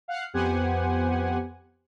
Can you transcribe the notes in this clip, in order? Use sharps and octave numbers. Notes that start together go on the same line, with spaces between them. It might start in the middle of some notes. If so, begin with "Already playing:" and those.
F5 F#5 F6 F#6 C7
F2 B3 G4 C5 F#5 G#5